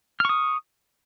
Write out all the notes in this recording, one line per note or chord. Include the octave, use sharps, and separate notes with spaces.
C#6 D#6 F6